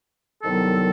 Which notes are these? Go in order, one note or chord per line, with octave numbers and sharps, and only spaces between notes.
C2 C3 D#3 F#3 B3 A4